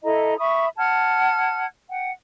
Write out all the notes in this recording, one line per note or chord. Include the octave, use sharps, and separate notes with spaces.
E4 A4 D#5 A#5
E5 B5 C#6 D#6
F#5 A5 F6 G#6
F#5 G5